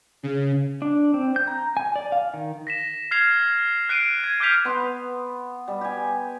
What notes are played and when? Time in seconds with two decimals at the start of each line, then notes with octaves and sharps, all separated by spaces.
0.23 C#3
0.82 D4
1.14 C4
1.36 G6
1.48 A#5
1.77 G#5
1.96 D5
2.12 F5
2.34 D#3
2.67 A#6 B6 E7
3.11 F6 G#6 C7 F7
3.89 F#6 C7 D7 D#7
4.24 G#6
4.40 D6 F6 G6 B6 F7
4.65 B3 C6
5.68 G3
5.81 G4 G#5